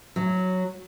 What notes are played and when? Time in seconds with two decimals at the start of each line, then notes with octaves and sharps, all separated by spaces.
0.16 F#3